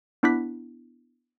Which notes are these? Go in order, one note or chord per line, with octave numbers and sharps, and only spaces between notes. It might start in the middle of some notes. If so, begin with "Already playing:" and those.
B3 D4 E4 D6 F#6 B6